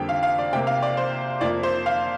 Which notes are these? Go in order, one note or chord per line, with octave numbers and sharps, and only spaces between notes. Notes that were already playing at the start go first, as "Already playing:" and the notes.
Already playing: F2 D3 G3 A#3 G5
F5
F5
D5
C3 A#3 G5
F5
D5
C5
F2 F3 A#3 D5
C5
F5